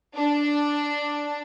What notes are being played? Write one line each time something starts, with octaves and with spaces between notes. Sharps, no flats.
D4